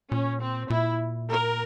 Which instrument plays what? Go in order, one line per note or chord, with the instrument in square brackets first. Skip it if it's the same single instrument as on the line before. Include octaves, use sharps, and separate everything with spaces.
[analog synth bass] A#2 [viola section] C#4
[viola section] C4
[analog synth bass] A#2 [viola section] E4
[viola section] A#4